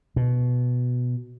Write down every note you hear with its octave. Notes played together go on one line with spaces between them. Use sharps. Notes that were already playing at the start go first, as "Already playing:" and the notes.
B2